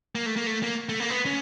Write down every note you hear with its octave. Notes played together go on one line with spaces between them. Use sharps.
A#3
A3
A#3
A3
A#3
A3
A#3
B3
C#4